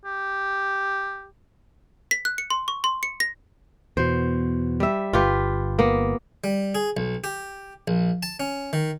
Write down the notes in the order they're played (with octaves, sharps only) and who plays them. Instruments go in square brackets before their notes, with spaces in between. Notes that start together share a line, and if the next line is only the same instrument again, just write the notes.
[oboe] G4
[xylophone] B6
F#6
C#7
C6
C#6
C6
C#7
A#6
[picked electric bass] E2 B2 [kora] C5
[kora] G3 E5
[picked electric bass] G1 [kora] F4 G4 B4
[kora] A#3 B3
[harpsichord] G3
G#4
B1
G4
A#1
A5
C#4
D#3